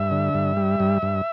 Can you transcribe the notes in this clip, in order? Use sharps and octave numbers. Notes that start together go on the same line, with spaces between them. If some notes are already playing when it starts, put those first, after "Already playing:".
Already playing: G2 E5
D3
G2
G3
G2
G2